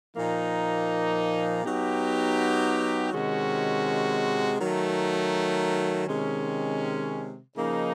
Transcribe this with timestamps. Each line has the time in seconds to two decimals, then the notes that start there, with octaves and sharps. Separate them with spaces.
0.15 A#2 F3 A#3 D#4
1.64 F#3 B3 D#4 G4
3.11 C3 D#3 G#3 C#4 F#4
4.59 D#3 F#3 A3
6.07 C3 D#3 G#3 C#4
7.55 C#3 F3 A#3 D#4